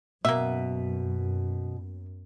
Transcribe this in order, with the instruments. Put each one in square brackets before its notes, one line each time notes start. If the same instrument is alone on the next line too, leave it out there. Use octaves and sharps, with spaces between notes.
[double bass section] F#2 [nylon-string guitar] B2 [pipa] A#3 E5